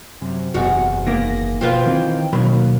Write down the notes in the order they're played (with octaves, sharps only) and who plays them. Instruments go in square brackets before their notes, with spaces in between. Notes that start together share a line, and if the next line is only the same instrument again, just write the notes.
[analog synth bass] F#2 [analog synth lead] C3
[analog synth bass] F#1 [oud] E2 F#4
[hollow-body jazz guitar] D#3 A#3 B3 [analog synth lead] A#6
[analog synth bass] B2 [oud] F3 F4 B4 [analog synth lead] G5
[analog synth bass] D#3 [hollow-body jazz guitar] E3 C4
[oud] D#2 [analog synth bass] B2 [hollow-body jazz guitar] D#3 F#3 B5 [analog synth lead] A#3